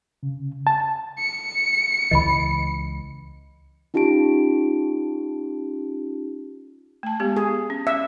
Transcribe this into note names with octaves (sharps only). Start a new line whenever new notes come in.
C#3
A5
C#7
C#2 E3 D#5 B5
C#4 D#4 F4 G4 A5 D7
A3 A5
G#3 B3 G4
G#4
C#4
E5